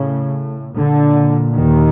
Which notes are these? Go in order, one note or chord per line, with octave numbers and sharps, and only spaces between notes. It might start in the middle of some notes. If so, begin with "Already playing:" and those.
Already playing: A2 C#3
A#2 D3
D#2 D#3